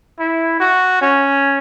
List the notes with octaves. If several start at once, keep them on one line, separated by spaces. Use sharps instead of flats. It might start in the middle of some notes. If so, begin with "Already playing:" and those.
E4
F#4
C#4